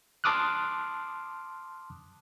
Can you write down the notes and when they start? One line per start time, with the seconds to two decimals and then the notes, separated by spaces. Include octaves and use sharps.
0.24 A5 C6 D6 D#6 F6 F#6